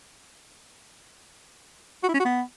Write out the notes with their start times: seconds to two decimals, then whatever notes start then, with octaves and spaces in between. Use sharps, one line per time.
2.03 F#4
2.09 E4
2.14 C#4
2.20 F#4
2.25 B3